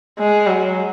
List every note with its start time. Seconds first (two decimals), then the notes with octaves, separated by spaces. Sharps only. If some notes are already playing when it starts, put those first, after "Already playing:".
0.19 G#3
0.47 F#3